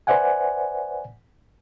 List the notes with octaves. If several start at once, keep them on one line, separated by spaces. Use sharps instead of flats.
B4 C5 D5 E5 F#5 G#5